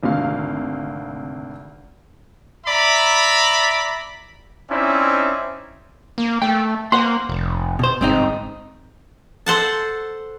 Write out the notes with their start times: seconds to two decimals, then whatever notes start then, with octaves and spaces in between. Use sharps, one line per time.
0.03 G#1 D2 C3 F5
2.66 D5 E5 A#5 B5
4.70 C4 C#4 D#4 E4 D5
6.18 A#3
6.42 A3 G5
6.92 A#3 C5 F#5 C6
7.29 F1
7.79 B2 C5
8.01 G1 G#2 C4 D#4
9.46 A4 C5 F#5 A5